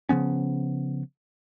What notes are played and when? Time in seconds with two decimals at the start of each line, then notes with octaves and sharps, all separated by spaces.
0.09 C#3 F3 B3 C#4